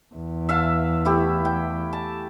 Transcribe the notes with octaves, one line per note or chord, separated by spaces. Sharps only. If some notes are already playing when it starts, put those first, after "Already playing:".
E2
E5 F5 A5
A3 E4 G4
G5
A5